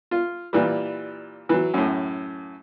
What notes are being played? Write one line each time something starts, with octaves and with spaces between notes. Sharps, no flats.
F4
A#2 E3 G3
E3 F#3
F#2 A2